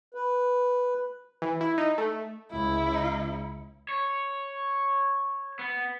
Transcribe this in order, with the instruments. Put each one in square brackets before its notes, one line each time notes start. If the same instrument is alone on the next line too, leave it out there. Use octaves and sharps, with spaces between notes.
[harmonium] B4
[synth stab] E3
E4
D#4
A3
[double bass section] C#2 [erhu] E4
[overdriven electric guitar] C#5
B3